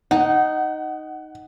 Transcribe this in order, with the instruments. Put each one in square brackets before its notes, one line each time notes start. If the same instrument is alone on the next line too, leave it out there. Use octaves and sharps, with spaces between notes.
[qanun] D#4 [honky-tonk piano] F#5